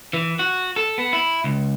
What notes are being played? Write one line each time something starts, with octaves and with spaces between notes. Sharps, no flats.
E3
F#4
A4
B3
E4
C#2